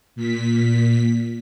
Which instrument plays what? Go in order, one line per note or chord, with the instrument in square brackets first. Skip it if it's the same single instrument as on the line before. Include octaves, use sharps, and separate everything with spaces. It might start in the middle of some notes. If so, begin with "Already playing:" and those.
[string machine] A#2 B6